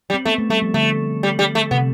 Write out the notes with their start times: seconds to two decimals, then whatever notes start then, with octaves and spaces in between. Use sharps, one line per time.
0.10 G3
0.14 C4
0.25 A3 B3
0.38 A3
0.50 G3 A3
0.62 F3
0.74 D3 A3
1.23 G3
1.39 G3
1.55 A3
1.71 C3 B3